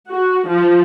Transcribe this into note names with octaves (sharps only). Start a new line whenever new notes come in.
F#4
F3